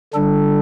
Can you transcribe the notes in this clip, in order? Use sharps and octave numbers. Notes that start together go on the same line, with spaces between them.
D3 G3 D4 A4